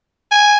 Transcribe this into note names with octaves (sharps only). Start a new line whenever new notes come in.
G#5